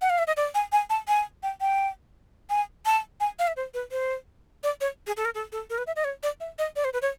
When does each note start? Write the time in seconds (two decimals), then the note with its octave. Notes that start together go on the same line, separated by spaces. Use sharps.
0.01 F#5
0.10 F5
0.18 E5
0.27 D#5
0.37 D5
0.55 G#5
0.72 G#5
0.90 A5
1.08 G#5
1.43 G5
1.61 G5
2.50 G#5
2.86 A5
3.20 G#5
3.39 F5
3.47 E5
3.56 C5
3.74 B4
3.92 C5
4.63 D5
4.81 C#5
5.07 G#4
5.17 A4
5.25 A#4
5.35 A4
5.52 A4
5.70 A#4
5.78 B4
5.87 E5
5.96 D#5
6.04 C#5
6.23 D5
6.40 E5
6.59 D#5
6.76 D5
6.84 C5
6.93 B4
7.02 C#5